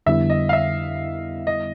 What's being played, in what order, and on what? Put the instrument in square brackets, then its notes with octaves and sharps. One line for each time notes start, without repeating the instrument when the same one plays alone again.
[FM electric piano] F2 D3 G3 B3 E4 [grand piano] E5
[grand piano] D#5
F5
E5
D#5